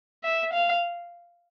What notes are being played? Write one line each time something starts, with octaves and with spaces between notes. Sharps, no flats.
E5
F5